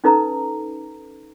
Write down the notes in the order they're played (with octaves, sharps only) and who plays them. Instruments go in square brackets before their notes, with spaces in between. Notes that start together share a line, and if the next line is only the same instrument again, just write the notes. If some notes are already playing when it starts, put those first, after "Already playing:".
[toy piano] C#4 D#4 A4 B4 A#5